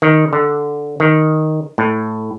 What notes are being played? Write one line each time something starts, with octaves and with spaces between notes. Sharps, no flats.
D#3
D3
D#3
A2